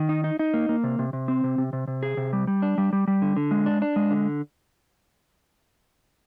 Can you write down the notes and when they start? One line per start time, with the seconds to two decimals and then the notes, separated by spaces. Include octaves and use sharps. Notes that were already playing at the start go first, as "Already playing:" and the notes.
Already playing: D#3
0.09 D#4
0.24 D#4
0.39 D#4
0.54 A#3
0.69 A#3
0.84 C3
0.99 C3
1.13 C3
1.28 C4
1.44 C3
1.58 C3
1.73 C3
1.88 C3
2.03 G#4
2.17 C3
2.33 G3
2.47 G3
2.62 D4
2.78 G3
2.93 G3
3.08 G3
3.22 D3
3.37 D3
3.51 G#3
3.66 D4
3.82 D4
3.96 G#3
4.11 D3